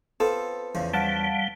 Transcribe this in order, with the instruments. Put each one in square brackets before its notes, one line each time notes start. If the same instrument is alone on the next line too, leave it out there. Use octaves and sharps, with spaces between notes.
[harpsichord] B3 C4 F4 [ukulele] A4
[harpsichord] E2 C#3 F3
[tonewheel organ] G3 [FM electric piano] F5 F#5 A5